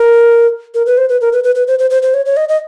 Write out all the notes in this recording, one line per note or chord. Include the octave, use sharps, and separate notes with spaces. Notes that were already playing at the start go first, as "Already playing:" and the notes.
Already playing: A#4
A#4
B4
C5
B4
A#4
B4
B4
B4
C5
C5
C5
C5
C#5
C#5
D#5
D#5